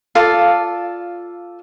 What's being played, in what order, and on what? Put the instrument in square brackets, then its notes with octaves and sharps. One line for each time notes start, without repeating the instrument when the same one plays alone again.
[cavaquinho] F4 A4 D5 F5